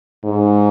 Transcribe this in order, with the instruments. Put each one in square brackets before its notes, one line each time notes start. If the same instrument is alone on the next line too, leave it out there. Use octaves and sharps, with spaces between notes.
[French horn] G#2